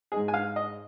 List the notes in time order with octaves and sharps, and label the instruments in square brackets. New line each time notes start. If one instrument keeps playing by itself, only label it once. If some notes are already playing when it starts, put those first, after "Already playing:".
[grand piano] G#2 G#3 D#4 [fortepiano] G#4
[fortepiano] G#5
F5
D#5